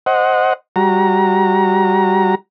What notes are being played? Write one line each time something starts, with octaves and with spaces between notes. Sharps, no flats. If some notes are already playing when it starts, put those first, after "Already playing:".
C5 D#5 F#5
G3 F#4 A#5